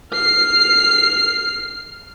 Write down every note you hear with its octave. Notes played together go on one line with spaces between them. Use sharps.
F6 C7